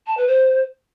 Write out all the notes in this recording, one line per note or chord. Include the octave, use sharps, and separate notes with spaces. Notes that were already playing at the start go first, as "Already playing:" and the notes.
A5
B4
C5